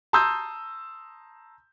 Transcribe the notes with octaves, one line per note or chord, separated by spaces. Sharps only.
A5 A#5 C6 D#6 E6 G6